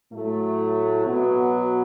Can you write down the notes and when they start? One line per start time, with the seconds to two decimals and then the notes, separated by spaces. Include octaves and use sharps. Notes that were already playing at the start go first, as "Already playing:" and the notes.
0.12 A2 F#3 A3
1.06 B2 F#3 B3